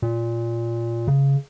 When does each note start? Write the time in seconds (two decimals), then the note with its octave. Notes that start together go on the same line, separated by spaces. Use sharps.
0.02 A#2
1.08 C#3